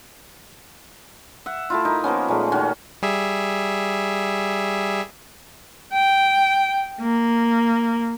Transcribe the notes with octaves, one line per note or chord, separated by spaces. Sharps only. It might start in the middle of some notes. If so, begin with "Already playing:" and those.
E5 F#5
A3 E4 F4
D#4 A#4
F3 A#3 B3 C#4
A#2 G#3 A3
D#3 C#4 F#4
G3 G#4 E5
G5
A#3